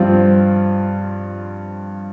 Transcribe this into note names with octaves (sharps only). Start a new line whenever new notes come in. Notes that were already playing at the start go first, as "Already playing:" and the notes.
Already playing: G2 F3 C4 F4